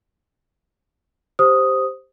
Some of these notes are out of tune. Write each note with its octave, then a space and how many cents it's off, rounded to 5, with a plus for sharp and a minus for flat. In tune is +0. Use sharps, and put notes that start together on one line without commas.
G4 +0 C5 +0 D#6 +0